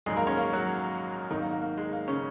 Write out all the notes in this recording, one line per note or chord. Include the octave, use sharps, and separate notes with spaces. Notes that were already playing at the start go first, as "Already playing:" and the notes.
A#1 G#2 D#3 F#3 G#3 G#4
A#3 A#4
C#4 C#5
A#3 A#4
F#3 F#4
G#1 G#2 D#3 F#3 D#4
A#3
A#3
A#3
G#3
A#3
C#3 C#4